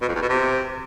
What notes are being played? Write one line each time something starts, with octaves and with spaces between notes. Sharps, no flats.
B2
F2
E2
B2
C3